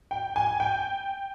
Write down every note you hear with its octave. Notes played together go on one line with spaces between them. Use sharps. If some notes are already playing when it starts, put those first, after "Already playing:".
G5
G#5
G5